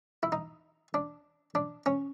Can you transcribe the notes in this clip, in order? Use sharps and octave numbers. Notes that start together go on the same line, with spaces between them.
E4
D#4
D4
D4
C#4